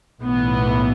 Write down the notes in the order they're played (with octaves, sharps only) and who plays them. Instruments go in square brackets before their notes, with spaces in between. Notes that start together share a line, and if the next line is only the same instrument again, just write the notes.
[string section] B1 A2 E3 B3